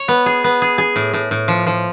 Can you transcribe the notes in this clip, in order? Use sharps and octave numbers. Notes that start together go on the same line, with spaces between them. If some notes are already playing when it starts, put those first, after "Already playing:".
Already playing: C#5
B3
G#4
B3
G#4
G#4
A2
A2
A2
F3
F3